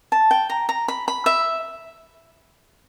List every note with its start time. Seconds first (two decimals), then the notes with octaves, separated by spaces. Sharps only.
0.12 A5
0.31 G5
0.50 A#5
0.69 A#5
0.88 B5
1.08 B5
1.26 E5